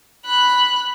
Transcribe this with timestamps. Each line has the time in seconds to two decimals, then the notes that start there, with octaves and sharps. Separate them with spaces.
0.25 B5 F#6